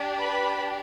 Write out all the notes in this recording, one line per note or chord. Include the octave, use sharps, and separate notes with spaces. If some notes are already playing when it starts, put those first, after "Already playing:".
Already playing: D4 G4
B4 B5